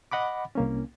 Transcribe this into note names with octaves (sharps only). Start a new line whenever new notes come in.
D#5 F#5 B5 D6
C2 A#3 C#4